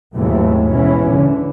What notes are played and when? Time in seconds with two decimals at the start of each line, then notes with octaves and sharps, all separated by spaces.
0.14 D#2 G#2 C3 E3 F#3 A3
0.67 G#2 B2 E3 C#4
1.11 D3 E3